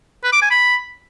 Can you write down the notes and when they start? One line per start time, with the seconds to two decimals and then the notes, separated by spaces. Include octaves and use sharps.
0.24 B4
0.33 D6
0.42 G#5
0.51 B5